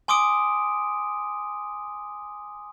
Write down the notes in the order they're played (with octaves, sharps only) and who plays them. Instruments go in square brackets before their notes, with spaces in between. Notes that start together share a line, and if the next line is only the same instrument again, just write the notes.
[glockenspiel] G#5 C6 D6 D#6 D7